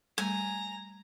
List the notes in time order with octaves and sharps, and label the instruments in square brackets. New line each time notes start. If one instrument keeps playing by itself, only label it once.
[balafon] G3 A3 [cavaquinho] G#5 [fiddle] A#5